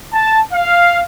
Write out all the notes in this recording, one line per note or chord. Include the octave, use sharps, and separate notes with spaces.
A5
F5